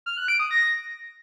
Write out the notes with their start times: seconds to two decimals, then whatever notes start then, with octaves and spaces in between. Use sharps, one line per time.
0.06 F6
0.17 F#6
0.28 D7
0.40 D#6
0.51 A#6